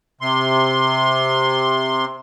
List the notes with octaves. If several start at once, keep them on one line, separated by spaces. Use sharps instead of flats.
C3 C6